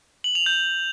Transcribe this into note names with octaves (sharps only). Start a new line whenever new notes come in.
F#7
F7
G6